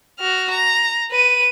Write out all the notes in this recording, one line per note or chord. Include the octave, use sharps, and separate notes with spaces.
F#4 F6
A#5
B4 D#7